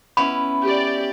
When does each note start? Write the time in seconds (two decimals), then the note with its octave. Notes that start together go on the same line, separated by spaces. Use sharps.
0.17 B3 C#4 E4 B5
0.64 G4 D5